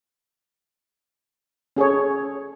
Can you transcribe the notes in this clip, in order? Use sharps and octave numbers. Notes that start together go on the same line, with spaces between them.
C#4 G#4 A4 C#5